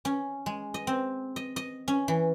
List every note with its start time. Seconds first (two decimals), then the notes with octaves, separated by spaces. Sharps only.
0.05 C#4
0.46 G#3
0.74 D#5
0.87 C4
1.36 D#5
1.56 D#5
1.88 C#4
2.08 E3